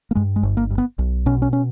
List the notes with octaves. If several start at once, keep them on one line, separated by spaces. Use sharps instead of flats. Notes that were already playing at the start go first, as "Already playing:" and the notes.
A#3
G2 G#3
G#3
G1
A#3
G2
B3
B1
B2 C#4
C#4
C#4